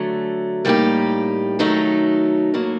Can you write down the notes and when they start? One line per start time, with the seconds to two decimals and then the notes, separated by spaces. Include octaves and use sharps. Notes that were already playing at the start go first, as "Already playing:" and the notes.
Already playing: D3 F#3 A3
0.65 A2 G3 A#3 D#4 G4
1.59 D#3 F#3 A3 D#4 A4
2.54 A2 F#3 A#3